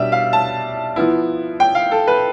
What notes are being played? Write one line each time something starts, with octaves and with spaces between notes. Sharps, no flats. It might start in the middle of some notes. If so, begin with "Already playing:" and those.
Already playing: B2 G3 D4 E5
F5
A5
F3 B3 E4
G5
F5
A4
B4